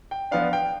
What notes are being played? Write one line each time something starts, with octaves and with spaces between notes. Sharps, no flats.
G5
F3 B3 D4 F5
G5